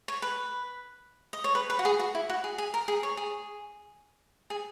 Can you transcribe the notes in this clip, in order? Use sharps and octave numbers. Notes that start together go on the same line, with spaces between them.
C#5
B4
D#5
C#5
B4
B4
F#4
G#4
F#4
E4
F#4
G#4
G#4
A#4
G#4
C#5
G#4
G#4